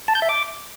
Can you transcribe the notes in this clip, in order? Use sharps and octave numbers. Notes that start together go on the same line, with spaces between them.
A5
G6
E5
D6